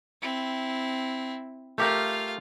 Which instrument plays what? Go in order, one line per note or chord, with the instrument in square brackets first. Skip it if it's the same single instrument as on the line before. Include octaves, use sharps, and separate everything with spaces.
[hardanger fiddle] C4 E4
[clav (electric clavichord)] A3 G4 A#4 [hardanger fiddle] F4 F5